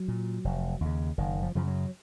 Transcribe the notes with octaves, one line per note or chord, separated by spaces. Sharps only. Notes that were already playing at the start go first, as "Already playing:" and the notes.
Already playing: F#3
A#2
F1
D#2 C#3
F#1 D#3
F3
F#2 C#3 F3
F#3